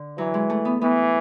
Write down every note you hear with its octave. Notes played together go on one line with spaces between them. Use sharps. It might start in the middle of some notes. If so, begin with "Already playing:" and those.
Already playing: D3
E3 F#3
G#3
A3
B3
E3 B3